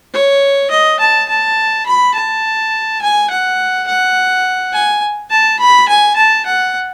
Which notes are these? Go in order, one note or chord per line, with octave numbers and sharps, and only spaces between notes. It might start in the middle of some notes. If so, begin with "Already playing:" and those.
C#5
D#5
A5
A5
B5
A5
G#5
F#5
F#5
G#5
A5
B5
G#5
A5
F#5